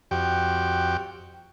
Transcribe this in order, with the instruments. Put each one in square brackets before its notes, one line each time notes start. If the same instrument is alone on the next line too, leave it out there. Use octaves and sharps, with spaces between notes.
[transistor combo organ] F2 F#4 G4 G5